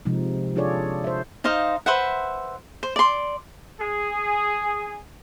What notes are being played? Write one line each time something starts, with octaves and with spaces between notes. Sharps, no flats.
C3 F3 G#3 D#4
D4 F4 G#4 A4 C#5 D5
C5 E5
D#4 C5 D#5 F5
B4 C5 E5 F#5
C5
D5 C6
G#4